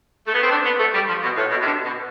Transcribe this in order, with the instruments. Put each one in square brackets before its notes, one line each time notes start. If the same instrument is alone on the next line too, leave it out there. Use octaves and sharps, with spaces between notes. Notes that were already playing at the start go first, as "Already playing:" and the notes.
[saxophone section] A3
B3
C4
D4
B3
A3
G3
F3
B2
A2
B2
C3
D3
B2